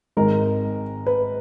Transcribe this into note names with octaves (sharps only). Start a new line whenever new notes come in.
G#1 G#2 D#3 G#3 D#4 A#4
B4